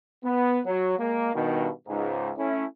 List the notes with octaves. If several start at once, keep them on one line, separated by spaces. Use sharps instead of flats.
B3
F#3
G#3 A#3
G2 B2 D#3
C#2 G#2
A3 C#4 E4